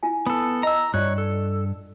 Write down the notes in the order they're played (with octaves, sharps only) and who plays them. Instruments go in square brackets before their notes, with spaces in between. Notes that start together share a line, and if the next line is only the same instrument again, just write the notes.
[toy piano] E4 F4 G#5
[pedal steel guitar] B3 A4
[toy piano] D#5 B5 [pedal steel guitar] A#5 E6
[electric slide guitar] G2 [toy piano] F4 D5 [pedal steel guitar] C#5 F#6
[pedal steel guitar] A4